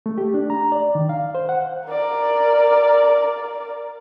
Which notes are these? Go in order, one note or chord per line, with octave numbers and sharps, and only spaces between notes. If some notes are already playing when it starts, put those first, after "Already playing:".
A3
G4
D4
A#5
D5
D#3
F5
C5
F#5
A#4 D5